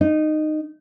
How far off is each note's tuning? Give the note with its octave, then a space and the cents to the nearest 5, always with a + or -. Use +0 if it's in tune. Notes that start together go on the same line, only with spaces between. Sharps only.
D#4 -15